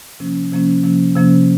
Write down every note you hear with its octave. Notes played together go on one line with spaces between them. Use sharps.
C3 F3 A#3 C#4
C3 F3 A#3 C#4
C3 F3 A#3 C#4
C3 F3 A#3 C#4